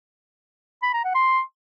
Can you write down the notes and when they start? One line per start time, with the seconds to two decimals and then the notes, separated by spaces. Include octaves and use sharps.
0.83 B5
0.93 A#5
1.04 F#5
1.15 C6